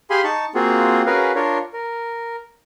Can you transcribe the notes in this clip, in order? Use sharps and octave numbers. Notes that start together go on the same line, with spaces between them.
G4 G#4 F5 G#5 B5 C6
D#4 A5 C#6
A#3 C4 F4 F#4 G#4
C#4 F#4 G#4 A#4 B4 F5
D4 F4 A#4 C#5
A#4